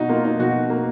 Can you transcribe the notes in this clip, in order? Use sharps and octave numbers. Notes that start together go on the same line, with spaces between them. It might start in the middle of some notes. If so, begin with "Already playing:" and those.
Already playing: B2 D#4 F#4
A#3 F4
D#4
B2 F#4
A#3